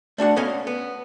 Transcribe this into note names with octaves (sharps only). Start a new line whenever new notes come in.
A3 D4 F#4 F#5
B3 C#4 A4 D#5 F5 G#5
B3